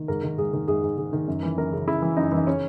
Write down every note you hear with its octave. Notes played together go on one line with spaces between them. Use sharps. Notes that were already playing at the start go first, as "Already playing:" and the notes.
Already playing: D#3
G#2 A#4
D#3
G#2 G#4
D#3
G#2 G#4
G#2
D#3 G#4
D#3
F#2
E3
F#2 A#4
C#3
C#3 E4
E3
F#2 D#4
E3
D#4
C#3 C#4